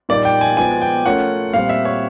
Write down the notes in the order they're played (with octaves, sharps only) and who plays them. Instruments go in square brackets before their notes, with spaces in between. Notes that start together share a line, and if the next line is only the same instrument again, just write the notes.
[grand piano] A#2 G3 A#3 D#4 [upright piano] D5
[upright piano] G5
G#5
[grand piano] F3 G#3 B3 [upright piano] G#5
[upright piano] G5
[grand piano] A3 C#4 F4 A#4 C#5 [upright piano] F#5
[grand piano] A#2 G3 C4 [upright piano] F5
[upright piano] E5
C#5